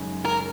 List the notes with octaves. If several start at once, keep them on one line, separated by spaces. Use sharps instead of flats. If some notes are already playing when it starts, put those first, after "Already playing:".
Already playing: F#2 C#3 G#3 D#4
A#4